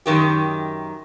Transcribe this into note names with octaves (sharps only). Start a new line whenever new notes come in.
F#2 D#3 G4